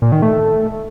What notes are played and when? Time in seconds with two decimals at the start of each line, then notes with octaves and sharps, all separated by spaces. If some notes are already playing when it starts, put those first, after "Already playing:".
0.02 A#2
0.12 D#3
0.22 A3